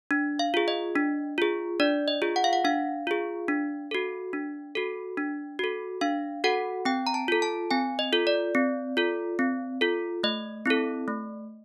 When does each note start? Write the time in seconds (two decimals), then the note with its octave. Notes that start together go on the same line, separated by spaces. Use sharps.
0.11 D4
0.39 F5
0.54 F4 G#4
0.68 D#5
0.96 D4
1.38 F4 G#4
1.80 D4 D5
2.08 D#5
2.22 F4 G#4
2.36 F#5
2.44 F5
2.53 F#5
2.65 D4 F5
3.07 F4 G#4
3.48 D4
3.91 F#4 A4
4.33 D4
4.75 F#4 A4
5.17 D4
5.59 F#4 A4
6.01 D4 F5
6.44 F#4 A4 F#5
6.85 C4 G5
7.07 A#5
7.14 A5
7.28 F4 A4
7.42 A5
7.71 C4 G#5
7.99 D#5
8.13 F4 A4
8.27 D5
8.55 C4
8.97 F4 A4
9.39 C4
9.81 F4 A4
10.23 A3 D#5
10.66 C4 E4 A4
11.08 A3